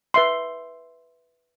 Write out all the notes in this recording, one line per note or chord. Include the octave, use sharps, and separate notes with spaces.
B4 E5 C6